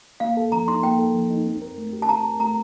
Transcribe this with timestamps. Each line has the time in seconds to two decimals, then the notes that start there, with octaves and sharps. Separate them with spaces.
0.20 A#3 F5
0.37 A4
0.52 F3 A#5
0.68 D#4 C6
0.83 A#3 G5
0.99 A4
1.14 F3
1.30 D#4
1.46 C4
1.62 A#4
1.78 A3
1.93 G4
2.02 A5
2.09 C4 A#5
2.25 A#4
2.40 A3 A#5